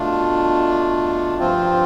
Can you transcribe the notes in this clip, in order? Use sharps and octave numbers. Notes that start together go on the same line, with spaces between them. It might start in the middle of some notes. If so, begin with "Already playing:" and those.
Already playing: B2 A3 D4 F4
G2 F3 C4 F4